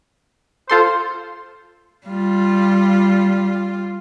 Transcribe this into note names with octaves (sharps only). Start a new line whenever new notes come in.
F4 A4 C5 C6
G3 F4